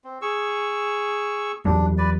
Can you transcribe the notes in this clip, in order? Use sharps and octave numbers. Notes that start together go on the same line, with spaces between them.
C4
G#4 C#6 E6
E2 F#3 G3 D4
B4 D5